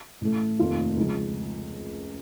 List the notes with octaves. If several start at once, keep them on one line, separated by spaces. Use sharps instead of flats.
A1 A2 A3
F1 D#2 D#3 A3 F4
C#2 C#3 F3